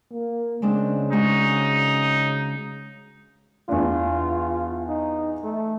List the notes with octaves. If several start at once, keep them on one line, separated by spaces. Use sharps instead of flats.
A#3
C#3 G#3 C4 D4
G#3 D#4 F#4
E2 D4 F4
D#4
A3